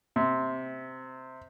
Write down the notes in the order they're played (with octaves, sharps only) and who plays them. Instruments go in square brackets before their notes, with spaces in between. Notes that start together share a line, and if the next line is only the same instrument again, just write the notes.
[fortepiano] C3